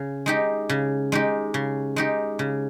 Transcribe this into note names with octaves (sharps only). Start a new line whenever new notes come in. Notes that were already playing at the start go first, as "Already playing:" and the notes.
Already playing: C#3
G#3 D#4 G4
C#3
G#3 D#4 G4
C#3
G#3 D#4 G4
C#3